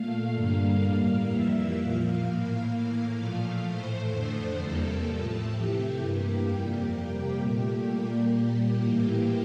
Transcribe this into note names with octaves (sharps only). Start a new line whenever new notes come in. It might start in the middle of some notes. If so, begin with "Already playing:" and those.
Already playing: A#2 A3 F5
G2 D3 G3 A#3
A2 G3 A#3
F2 E3 G3 A#3 E5
A#2 F3 A#3 F5
A2 E3 A#3
A2 E3 A#3
A#2 F3 A3
A2 E3 A3 C5
F2 D3 F3 A3
E2 C3 G3 A#3 A4
A2 F3 A3
C3 E3 A3 G4
G2 E3 A#3 G4
F2 C3 G3 A#3
C3 G3 A#3
A#2 A3 G4
A#2 G3 A#3
A#2 G3 A#3
A2 E3 A#3 G4